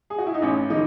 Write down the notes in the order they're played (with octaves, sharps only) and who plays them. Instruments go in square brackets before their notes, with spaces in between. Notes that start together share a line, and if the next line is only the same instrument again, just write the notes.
[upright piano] G#4
F#4
E4
D#4
A1 C#4
D#3 D#4